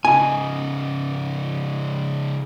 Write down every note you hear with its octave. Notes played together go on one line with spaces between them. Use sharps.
C#3 D#4 G#5